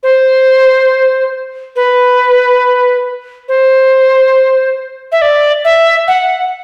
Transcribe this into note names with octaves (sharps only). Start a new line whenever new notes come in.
C5
B4
C5
E5
D5
E5
F#5